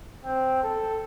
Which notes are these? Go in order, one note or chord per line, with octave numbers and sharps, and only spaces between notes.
C4
A4